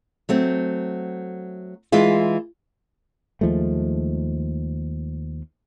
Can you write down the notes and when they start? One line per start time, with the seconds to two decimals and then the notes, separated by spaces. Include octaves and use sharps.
0.29 F#3 A3 C4
1.92 E3 G#3 E4 F4
3.41 D#2 F3 G#3 A3